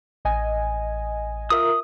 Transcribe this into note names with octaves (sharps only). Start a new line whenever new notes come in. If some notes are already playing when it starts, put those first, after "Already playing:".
A1 D#5 G#5
F4 A#4 E5 D#6